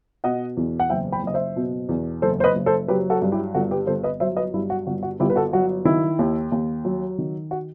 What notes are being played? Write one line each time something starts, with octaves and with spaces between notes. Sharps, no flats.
B2 D#5 F#5
E2
F#5
F#1 E5 G5
G5 B5
F#1 D#5
C5 E5
B2
E2
F#1 A4 C5
C5
B4 D#5
F#1
A4 C5
F#3 G4 B4
F#4 A4
G2
E4 G4
G1 F#4 A4
G4 B4
G1 A4 C5
B4 D#5
F#3 C5 E5
B4 D#5
G2 E4
F#4
G1 F#4
F#4
G1 E4 G4
B4
F#4 A4
F#3 F#4
D#3 E4
D#2
D#2
F#3
D#3
F#4